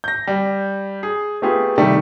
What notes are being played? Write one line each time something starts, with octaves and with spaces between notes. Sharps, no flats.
G6 A#6
G3
G#4
A3 B3 F4 G4 G#4
C3 D#3 G3 A3